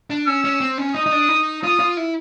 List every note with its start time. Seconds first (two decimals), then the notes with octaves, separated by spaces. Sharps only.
0.10 D4
0.27 C#4 E6
0.44 C#4
0.61 C4
0.78 C#4
0.95 D#4 D#6
1.06 D#4
1.12 D4
1.29 D#4
1.63 F4 D#6
1.80 F4
1.97 E4